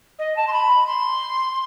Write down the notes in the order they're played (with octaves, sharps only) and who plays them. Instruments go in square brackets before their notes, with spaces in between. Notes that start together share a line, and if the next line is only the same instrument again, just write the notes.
[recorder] D#5
A5
C6
B5
C6